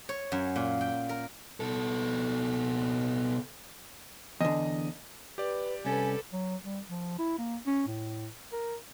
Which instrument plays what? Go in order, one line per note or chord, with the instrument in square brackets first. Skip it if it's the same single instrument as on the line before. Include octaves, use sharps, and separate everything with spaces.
[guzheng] C#5
F#2
A#2
G5
A#4
[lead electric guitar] B2 A4
[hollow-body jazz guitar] E2 D3 [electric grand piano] D#5
[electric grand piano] G4 D5 [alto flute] B4
[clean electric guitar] C2 C#4 [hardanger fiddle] A4 B4 [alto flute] G#5
[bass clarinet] F#3
G3
F3
E4
A#3
C#4
A2
A#4